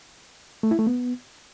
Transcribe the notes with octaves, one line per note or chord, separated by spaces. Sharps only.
A3
E4
A3
B3